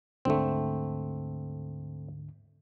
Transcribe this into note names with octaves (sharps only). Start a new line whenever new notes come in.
D2 G#2 D3 A3 C4